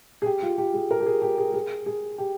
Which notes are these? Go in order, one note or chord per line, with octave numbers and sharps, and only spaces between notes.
G#4
G4
F4
G4
G#4
A#4
G4
G#4
G4
G#4
G#4
G#4
G4